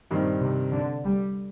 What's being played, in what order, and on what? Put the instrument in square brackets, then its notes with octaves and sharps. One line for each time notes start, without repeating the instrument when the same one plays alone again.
[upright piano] G2 D#3 G3 C4 [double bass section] A#2
[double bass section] C3
D3
G3